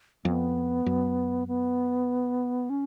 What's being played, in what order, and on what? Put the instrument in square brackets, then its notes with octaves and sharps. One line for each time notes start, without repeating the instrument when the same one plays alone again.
[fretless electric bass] F2 [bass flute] B3
[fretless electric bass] F#2
[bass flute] B3
C#4